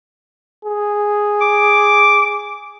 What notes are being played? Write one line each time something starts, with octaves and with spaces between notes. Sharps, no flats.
G#4
D6